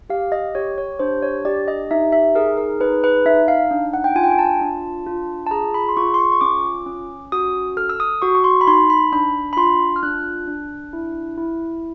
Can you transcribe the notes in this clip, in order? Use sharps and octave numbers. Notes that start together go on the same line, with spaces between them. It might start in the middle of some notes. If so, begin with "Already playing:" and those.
G4 F5
D#5
G4 C#5
C#5
D4 C5
C#5
G4 D5
D#5
D#4 E5
E5
G#4 A#4
A#4
D#4 B4
B4
D#4 E5
F5
D4
F#5
G5
F4 G#5
G5
G#5
A5
D4
F4
A5
G#4 A#5
B5
C6
F4 C#6
C6
C#6
C#6
C#4 D6
C#4
F#4 D#6
A4 F6
E6
D#6
F#4 C#6
C#6
C6
B5
D#4 C6
B5
D4 B5
B5
F4 C6
F6
D4 F#6
D4
E4
E4